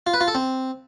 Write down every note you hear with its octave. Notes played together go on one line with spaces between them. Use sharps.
F4
B4
F4
A4
C4